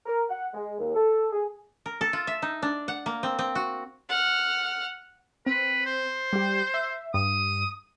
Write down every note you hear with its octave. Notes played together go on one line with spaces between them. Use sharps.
A#4
F#5
G#3
D#2
A4
G#4
A#4
A4
F4
E5
D#4
D4
F#5
A#3
C4
C4
F#4
F#5 F6
C4 B4
C5
G3 G4
E5
G2 D#6